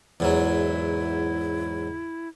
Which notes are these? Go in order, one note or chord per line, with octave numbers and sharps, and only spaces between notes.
E2 G#2 F#3 E4